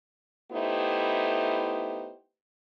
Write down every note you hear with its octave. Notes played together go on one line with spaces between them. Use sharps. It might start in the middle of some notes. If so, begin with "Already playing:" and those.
A3 B3 D#4 E4 G4 C5